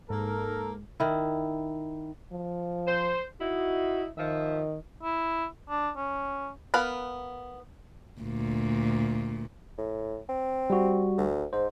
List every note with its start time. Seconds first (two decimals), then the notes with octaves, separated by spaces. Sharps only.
0.10 G#2 A#3 A4 A#4
1.00 D#3 E4
2.32 F3
2.87 C5
3.40 D#4 E4 F#4
4.18 D#3 F3 E5
5.03 E4
5.70 D4
5.97 C#4
6.74 B3 A#4 B4 F5
8.20 D2 A#2
9.78 A2
10.29 C4
10.70 G3 F#4
11.17 D2
11.53 G#2 C5